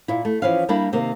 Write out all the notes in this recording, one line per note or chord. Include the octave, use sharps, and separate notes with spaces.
A#2 E4
A3
E3 F3 C#4 E4 F5
G3 A#3 D4 E4 G4
C3 D#3 A#3